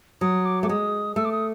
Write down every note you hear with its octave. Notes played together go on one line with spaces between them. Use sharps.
F#3 D#6
D6
A3 D6
G#3 D#6
A3 E6
D6
D#6